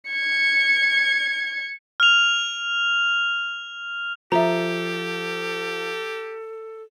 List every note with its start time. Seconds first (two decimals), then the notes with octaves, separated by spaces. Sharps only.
0.10 G#6 C#7
2.00 F6 F7
4.32 F3 G4 A4 E5 A#5